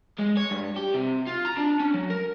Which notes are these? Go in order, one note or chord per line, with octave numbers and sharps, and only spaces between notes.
G#3
C#5
G2
G4
C3
F4
A#5
D4
C#4
F#3
A#4